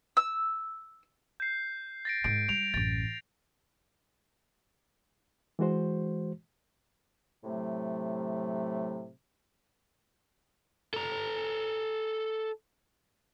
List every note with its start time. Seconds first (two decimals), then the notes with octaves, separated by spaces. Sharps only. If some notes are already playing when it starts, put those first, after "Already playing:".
0.17 E6
1.40 G6 C7
2.05 A6 A#6 D7
2.24 G#2 D#3 D7
2.48 G3 D7 F7
2.74 A1 F#2 A6
5.59 E3 G#3 F#4 C5
7.44 A2 C3 F#3 A3
10.94 A4 A#5